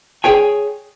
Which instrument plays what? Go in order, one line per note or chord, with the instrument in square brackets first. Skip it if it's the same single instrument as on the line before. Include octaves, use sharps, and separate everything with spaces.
[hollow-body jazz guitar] G#4 C#5 G5 G#5